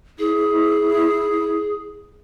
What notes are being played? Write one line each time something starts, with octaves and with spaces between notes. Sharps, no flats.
E4 G#4